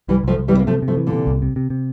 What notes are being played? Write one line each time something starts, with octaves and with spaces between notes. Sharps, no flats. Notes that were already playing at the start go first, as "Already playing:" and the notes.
C2 E3 G3
C2 F3 A3
C2
E3 G3
C3
A#3
C3 F3 A3
C3
F3 A3
E3
A#2 D3
C3
C2
C3
C3
C3